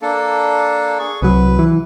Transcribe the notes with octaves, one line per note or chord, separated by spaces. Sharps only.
A#3 D4 A4
G#4 C#6
C2 F#3 B4
E3